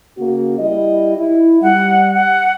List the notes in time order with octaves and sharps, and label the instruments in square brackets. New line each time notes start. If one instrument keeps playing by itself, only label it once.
[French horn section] C#3 A#3 F#4
G3 E4 D#5
E4
[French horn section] G3 [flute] F#5
[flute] F#5